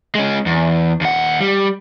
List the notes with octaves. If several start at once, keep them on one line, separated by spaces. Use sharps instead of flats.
G#3 C#4
E2
D#2 F#5
G3